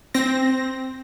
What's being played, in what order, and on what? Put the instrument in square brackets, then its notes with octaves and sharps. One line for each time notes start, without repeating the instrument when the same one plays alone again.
[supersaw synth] C4 A#6